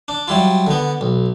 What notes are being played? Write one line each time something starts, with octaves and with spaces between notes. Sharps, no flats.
D4
F#3 G3 E4 F4
D3 B3
B1